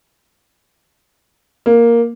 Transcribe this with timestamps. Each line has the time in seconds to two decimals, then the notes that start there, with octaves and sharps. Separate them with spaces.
1.66 A#3